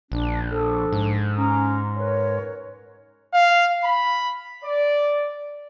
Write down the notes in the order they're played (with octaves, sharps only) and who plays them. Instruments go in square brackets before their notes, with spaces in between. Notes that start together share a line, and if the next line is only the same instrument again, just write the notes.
[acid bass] A#1 [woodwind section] D4
[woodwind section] F3 D4 A4
[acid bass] G#2
[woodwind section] C#4 A#5
A#4 B4 C#5
[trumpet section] F5
B5
D5